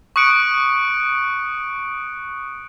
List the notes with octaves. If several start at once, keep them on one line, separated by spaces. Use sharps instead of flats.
C#6 D#6 F#6 C#7 D7